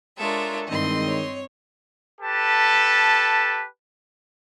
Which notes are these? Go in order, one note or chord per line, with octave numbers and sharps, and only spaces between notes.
G#3 D4 F4 A4 A#4 C#5 E5
G2 D#3 E3 G#3 C4 D#5 C6
C#5
G4 A4 B4 A5